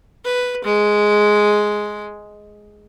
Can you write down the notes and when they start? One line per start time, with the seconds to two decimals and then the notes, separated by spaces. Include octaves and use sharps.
0.24 B4
0.64 G#3